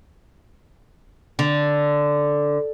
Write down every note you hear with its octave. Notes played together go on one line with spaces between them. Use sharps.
D3